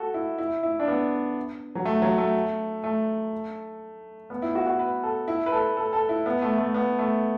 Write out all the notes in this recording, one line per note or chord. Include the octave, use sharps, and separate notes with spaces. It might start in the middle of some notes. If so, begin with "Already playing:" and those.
Already playing: F#4 A4
E4
E4
E4
D4
B3
F#3
A3
F#3
A3
A3
B3
E4
F#4
F#4
B4
A4
E4
B4
A4
A4
A4
E4
B3
A3
A3
B3
A3